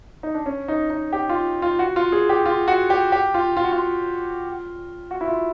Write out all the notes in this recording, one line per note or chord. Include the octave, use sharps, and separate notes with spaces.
D#4
D4
C#4
D#4
D#4
G4
F4
F4
F#4
F4
G#4
G4
F4
F#4
G4
G4
F4
F4
F#4
F4
F#4
E4
F4